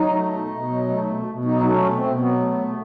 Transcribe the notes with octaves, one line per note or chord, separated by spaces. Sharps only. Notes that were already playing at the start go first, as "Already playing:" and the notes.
Already playing: F#3 D#4
A3
B2
B2
F#3
A3
B2
B2
F#3 D#4
A3
C#4
B2
C4
B2
F#3 B3
A3
B2